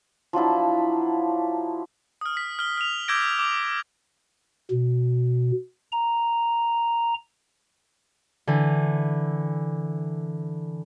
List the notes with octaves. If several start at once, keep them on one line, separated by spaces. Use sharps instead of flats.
F3 F#3 D4 E4
D#6 F6
B6
F6 G7
F6 F7
D6 E6 G6 G#6 A#6 D7
D6
B2
A#5
D3 E3